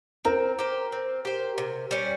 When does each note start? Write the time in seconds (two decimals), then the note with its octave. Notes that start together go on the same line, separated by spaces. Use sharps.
0.25 C4 A#4 A#5
0.59 G4 C5
0.92 C4
1.25 G4 C5
1.58 C3
1.91 G3 C#4